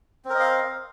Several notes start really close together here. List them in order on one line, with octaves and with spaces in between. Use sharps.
C4 A#4 D#5 F5